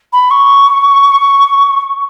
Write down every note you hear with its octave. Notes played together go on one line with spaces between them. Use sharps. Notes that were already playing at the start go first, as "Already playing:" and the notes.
B5
C#6